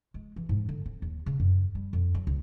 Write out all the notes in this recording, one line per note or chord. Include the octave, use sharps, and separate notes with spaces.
G#3
E3
G#2
D3
C4
D#2
C#3
F#2
G3
F2
F#3
C#2